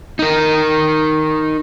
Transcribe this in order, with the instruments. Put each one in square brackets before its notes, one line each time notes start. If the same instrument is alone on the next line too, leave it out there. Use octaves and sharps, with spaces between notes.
[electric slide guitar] D#4 A#4